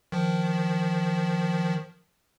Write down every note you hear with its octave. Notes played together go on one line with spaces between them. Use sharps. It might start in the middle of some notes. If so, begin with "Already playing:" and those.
D#3 F3